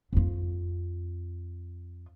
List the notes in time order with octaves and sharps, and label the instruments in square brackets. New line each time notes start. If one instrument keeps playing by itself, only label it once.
[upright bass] F2 F4